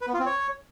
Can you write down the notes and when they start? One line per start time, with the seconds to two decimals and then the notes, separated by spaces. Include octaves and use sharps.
0.01 B4
0.07 B3
0.14 F4
0.20 C4
0.26 C#5